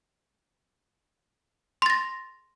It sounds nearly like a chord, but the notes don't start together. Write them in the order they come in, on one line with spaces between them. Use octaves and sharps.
C6 A6 A#6